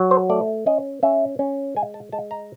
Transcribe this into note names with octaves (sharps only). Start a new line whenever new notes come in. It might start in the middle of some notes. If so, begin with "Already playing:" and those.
Already playing: F#3
C5
A3 D5
C#4 D#5
C#4 E5
C#4
G#3 G#5
A5
G#3 A5
A#5